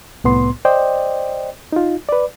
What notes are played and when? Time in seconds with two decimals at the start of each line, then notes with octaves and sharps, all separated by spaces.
0.24 C2 A2 B3 C6
0.65 C5 D5 D#5 G5
1.73 D#4 F4
2.09 B4 D5